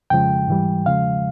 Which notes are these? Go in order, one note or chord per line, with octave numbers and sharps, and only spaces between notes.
F2 C#3 F3 G#3 G5
G#2 E3 G3
E2 C#3 F3 G#3 F5